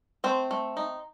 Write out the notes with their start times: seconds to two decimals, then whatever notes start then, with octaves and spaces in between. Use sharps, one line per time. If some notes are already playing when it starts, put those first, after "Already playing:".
0.24 A3 C4 C5
0.51 A3
0.77 D#4